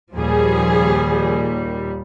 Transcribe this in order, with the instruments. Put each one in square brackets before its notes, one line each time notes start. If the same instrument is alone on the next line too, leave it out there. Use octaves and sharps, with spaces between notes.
[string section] D#2 A#2 G3 [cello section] F3 G#4